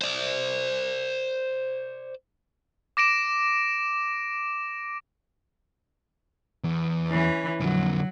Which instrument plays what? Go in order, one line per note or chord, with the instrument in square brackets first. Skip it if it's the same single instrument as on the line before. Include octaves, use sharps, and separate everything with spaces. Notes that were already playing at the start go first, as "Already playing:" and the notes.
[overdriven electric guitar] C5 D5
[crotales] D6 A#6 D7 E7
[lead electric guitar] E2
[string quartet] E3 C#4
[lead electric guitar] F2 D3 [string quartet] F#3